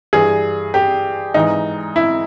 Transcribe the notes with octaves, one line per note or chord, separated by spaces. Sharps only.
G2 E3 G#4
G4
G#2 E3 D#4
E4